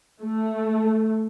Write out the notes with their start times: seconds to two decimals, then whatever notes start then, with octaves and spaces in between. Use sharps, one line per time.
0.22 A3